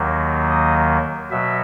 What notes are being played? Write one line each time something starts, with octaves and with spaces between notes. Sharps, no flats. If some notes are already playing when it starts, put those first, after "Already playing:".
Already playing: D#2 D#3 F#3 A#3
D#5
B2 F#3 E5